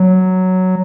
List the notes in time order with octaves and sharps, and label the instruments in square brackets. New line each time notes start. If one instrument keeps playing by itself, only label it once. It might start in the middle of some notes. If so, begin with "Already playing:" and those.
Already playing: [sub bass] F#3